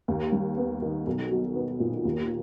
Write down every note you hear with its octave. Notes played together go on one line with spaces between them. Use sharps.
D#2
G3
B3
D#3
B1
F#3
B3
A#2
D#2